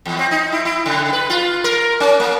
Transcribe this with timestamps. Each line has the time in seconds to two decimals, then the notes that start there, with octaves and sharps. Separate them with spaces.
0.06 E2
0.19 C4
0.31 D#4
0.52 E4
0.65 E4
0.86 C#3
1.13 B4
1.30 F4
1.64 A#4
2.00 C#4
2.20 A#3